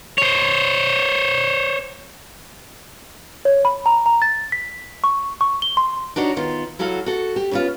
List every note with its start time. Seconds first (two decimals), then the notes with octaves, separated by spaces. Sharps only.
0.18 C5 C#5
3.45 C#5
3.65 B5
3.86 A#5
4.06 A#5
4.22 A6
4.52 B6
5.04 C#6
5.41 C#6
5.62 G7
5.77 C6
6.16 D4 D#4 F#4 C#5
6.37 D#3 B3 F4
6.79 F#3 E4 F#4 A4 F5
7.06 F#4 A4
7.36 G4
7.51 C#3 B3 F4